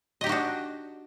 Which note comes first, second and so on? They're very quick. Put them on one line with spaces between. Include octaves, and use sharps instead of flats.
D#5 G4 D#4 F#4 D4